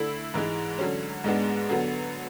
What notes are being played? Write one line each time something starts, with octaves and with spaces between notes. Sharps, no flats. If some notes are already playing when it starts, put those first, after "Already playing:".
Already playing: D3 A3 E4
G#2 E3 G#3
D3 F#3 C#4
G#2 G#3 B3 D4
D3 F#3 B3